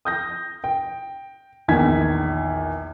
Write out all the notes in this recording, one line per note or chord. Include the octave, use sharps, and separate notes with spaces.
D#6 G6 A#6
G5
A#1 E2 D#3 G#6 B6